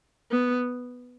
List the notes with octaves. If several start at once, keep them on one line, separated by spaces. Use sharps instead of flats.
B3